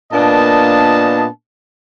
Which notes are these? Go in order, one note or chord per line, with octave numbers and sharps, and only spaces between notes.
A#2 A#3 B3 D4 D#5 A5